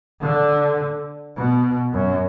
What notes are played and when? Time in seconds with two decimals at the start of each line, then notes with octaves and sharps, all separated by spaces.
0.22 D3
1.36 B2
1.93 F#2